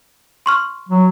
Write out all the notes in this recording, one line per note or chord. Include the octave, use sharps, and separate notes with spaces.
C6 C#6 F6
F#3